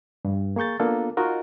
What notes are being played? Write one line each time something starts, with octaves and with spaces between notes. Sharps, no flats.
G2
A#3 G#4 C#6 G6 A6
A#3 B3 D4 F4 A4
D#4 F4 F#4 A#4 D#5